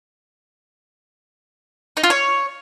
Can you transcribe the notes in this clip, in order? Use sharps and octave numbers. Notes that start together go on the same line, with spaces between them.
D#4
F4
C#5